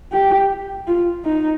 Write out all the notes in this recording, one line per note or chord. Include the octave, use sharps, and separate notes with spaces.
G4
F4
D#4